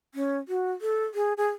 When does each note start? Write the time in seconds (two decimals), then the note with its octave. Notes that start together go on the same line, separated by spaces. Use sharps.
0.14 C#4
0.48 F#4
0.81 A4
1.14 G#4
1.37 G#4